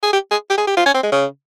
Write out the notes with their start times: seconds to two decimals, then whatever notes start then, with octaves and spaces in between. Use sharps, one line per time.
0.03 G#4
0.13 G4
0.31 G#4
0.50 G4
0.58 G#4
0.67 G4
0.77 F4
0.86 C#4
0.94 C4
1.03 G#3
1.12 C#3